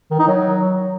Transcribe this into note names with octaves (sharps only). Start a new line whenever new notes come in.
D#3
D#4
F#3